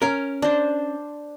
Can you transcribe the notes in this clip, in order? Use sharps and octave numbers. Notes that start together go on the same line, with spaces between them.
C#4 A#4
D4 C5